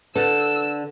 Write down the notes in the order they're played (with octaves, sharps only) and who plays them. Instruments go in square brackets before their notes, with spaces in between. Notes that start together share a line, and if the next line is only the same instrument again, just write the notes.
[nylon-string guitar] D3 [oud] A4 [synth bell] B4 [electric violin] E6